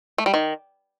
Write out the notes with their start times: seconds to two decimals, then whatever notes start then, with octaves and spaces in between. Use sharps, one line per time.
0.18 A3
0.26 G3
0.34 D#3